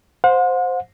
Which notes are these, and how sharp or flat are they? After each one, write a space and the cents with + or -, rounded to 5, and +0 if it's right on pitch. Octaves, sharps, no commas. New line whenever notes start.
C5 +0 F#5 -45